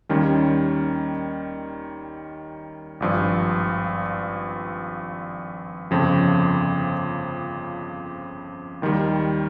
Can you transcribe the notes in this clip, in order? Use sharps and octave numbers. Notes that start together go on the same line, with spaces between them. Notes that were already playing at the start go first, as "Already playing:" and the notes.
D#2 D#3 G3 C#4
G#1 G2 F3
G1 F2 C#3 F3
D#2 D#3 G3